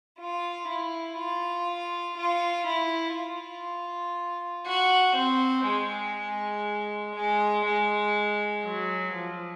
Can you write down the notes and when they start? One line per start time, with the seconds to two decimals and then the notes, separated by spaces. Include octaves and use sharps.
0.18 F4
0.68 E4
1.18 F4
2.17 F4
2.68 E4
3.17 F4
4.67 F#4
5.16 C4
5.65 G#3
7.15 G#3
7.65 G#3
8.64 F#3
9.15 F3